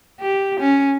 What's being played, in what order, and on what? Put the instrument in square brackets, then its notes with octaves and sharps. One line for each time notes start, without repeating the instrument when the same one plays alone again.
[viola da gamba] G4
C#4